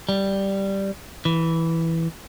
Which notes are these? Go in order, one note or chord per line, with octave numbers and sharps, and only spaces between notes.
G3
E3